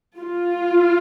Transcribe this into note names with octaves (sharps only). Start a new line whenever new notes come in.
F4